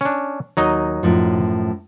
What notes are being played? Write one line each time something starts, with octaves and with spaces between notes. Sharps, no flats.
C#4 D4
D#2 F#3 D#4 D#5
F#2 A2 F3